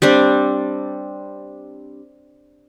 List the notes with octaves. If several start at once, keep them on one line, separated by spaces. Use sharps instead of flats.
G3 C4 D4